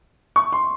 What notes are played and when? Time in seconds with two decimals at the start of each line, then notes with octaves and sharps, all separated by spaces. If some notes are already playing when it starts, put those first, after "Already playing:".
0.36 C#6
0.53 C6